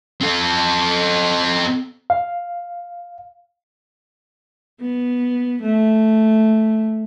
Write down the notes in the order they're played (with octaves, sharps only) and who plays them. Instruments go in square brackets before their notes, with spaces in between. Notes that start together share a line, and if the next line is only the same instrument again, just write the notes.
[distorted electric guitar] C4 A4
[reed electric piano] F5
[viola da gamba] B3
A3